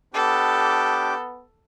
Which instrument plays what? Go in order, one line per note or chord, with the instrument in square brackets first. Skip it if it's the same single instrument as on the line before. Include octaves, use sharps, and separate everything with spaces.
[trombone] B3 [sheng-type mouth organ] D4 G4 D6 [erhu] A4